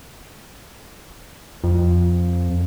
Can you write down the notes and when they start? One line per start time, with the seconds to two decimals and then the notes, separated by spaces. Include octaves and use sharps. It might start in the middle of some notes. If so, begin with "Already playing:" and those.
1.64 F2